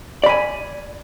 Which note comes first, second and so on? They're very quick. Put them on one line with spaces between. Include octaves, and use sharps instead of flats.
D5 B5 G#5